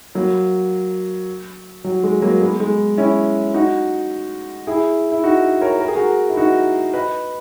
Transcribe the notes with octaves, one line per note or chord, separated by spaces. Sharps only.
F#3 A#3
F#3
G#3
F#3 A#3
G#3 B3
G#3
C#4 E4
D#4 F#4
E4 G#4
E4
D#4 F#4
A#4 C#5
A#4
G#4
F#4 A#4
E4
D#4 F#4
B4 D#5